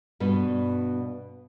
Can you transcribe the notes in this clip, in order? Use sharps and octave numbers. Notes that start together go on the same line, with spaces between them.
G2 B2 B4